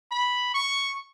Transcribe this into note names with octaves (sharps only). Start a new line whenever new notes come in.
B5
C#6